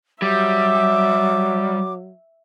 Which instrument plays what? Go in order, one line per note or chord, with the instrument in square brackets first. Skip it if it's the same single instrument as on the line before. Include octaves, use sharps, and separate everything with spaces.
[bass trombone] F#3 [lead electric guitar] G3 [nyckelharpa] E5 [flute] D6